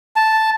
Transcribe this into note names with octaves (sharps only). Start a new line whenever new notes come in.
A5